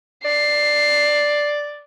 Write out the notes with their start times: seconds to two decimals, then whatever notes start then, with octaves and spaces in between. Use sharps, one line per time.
0.25 D5 C7